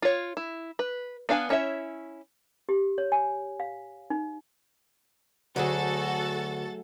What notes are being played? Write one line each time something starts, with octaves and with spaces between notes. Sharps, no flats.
F4 C#5
E4
B4
B3 D4 F5 G#5
C#4 E4 C#5 E5
G4
C#5
G#5
F5
D#4
D2 F#3 A3 F#4 G#4 A4 A6